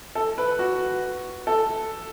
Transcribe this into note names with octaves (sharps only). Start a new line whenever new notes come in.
A4
B4
F#4
A4